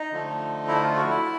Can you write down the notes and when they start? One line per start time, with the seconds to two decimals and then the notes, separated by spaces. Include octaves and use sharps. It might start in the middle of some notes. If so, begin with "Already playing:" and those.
Already playing: D#4
0.12 D3 F3 A3
0.68 E4
0.82 F4
0.96 F#4
1.10 E4